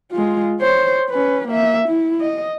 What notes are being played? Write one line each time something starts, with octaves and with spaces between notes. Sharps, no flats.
G#3 F4
C5 C#5
C#4 B4
A#3 E5
E4
D#5